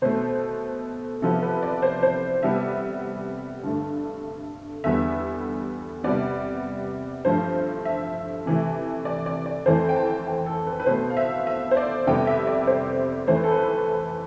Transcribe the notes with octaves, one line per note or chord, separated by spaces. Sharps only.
B2 A3 C5
C3 F3 B3 A4
B4
D5
C5
C5
C3 G3 B3 E5
G2 D3 A3
E2 D3 G3 B3 E5
C3 G3 B3 D5
G2 F3 A3 C5
E5
C3 E3 A3
D5
D5
D5
F2 E3 A3 C5
G5
A5
G5
A4
B4
B4
B2 A3 C5
F5
E5
E5
C5
D5
F2 C3 G3 B3 G5
E5
D5
C5
F2 E3 A3 C5
B4
A4
B4